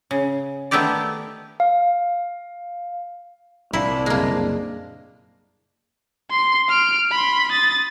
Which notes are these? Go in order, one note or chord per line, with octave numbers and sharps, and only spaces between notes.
C#3
D#3 A3 B3 E4 G4 D5
F5
C2 A#2 D4 E4
F#1 A#2 G#3 A#3
C6 C7
F6 D7
B5 C6
D#6 A6